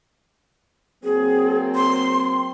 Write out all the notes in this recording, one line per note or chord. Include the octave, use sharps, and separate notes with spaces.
F#3 A#3 C4 G#4
C6